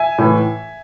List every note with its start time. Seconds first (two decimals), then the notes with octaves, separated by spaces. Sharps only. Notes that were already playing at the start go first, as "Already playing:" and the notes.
Already playing: E5 G#5
0.18 A2 E3